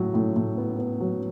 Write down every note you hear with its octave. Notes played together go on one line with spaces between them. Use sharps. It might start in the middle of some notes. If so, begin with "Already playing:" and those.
Already playing: A2 F#3
A2
A2
B3
B3
F#3